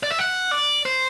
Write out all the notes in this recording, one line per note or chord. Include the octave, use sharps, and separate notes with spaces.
D5
E5
F#5
D5
C5